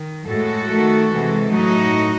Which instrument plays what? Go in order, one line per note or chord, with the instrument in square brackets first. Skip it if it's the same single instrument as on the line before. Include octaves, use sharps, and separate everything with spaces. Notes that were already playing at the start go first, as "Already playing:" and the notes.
Already playing: [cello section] D#3
A2 G#3 F#4 A4
D#3 A3
C3 E3 G#3
A2 F#3 A3 D#4 F#4